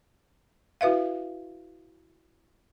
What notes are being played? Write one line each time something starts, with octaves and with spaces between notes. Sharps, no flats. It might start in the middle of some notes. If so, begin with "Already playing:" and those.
E4 F#4 B4 E5 F5